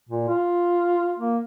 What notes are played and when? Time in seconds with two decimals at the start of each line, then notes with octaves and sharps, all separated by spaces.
0.09 A#2
0.28 F4
1.19 A#3